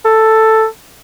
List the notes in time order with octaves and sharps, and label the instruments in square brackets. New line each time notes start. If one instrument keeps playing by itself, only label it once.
[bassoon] A4